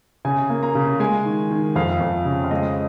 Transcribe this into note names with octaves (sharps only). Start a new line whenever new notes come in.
C#3 G#5
A#3
A#5
C#3
G#3 G#5
D#3
D#3
F2 F5
F2
C#3
F5
G#3 D#5